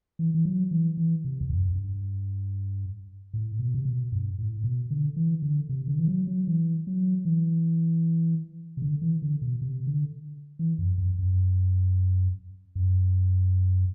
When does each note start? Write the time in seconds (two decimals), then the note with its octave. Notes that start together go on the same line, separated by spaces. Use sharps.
0.19 E3
0.34 E3
0.45 F#3
0.71 E3
0.97 E3
1.25 C3
1.41 E2
1.50 F#2
1.71 F#2
1.76 G2
3.33 A2
3.59 B2
3.74 C3
3.85 B2
4.12 G2
4.38 A2
4.64 B2
4.90 D3
5.16 E3
5.42 D3
5.69 C3
5.88 D3
5.99 E3
6.08 F#3
6.27 F#3
6.47 E3
6.87 F#3
7.25 E3
8.77 C3
8.82 D3
9.02 E3
9.22 D3
9.42 B2
9.62 C3
9.87 D3
10.59 E3
10.78 F#2
10.98 F#2
11.19 F#2
12.75 F#2